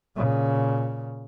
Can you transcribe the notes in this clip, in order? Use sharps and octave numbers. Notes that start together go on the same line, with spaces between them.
A#2 C#3